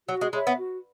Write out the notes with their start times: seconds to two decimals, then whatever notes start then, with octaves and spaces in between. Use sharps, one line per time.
0.08 F#3 F#4
0.21 G#3
0.33 G#3 C#5 E5 B5
0.47 B3
0.58 F#4